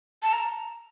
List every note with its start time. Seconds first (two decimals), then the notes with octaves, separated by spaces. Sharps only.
0.23 A5
0.33 A#5